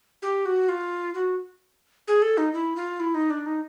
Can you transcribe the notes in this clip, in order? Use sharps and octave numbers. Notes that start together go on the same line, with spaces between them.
G4
F#4
F4
F#4
G#4
A4
D#4
E4
F4
E4
D#4
D4
D#4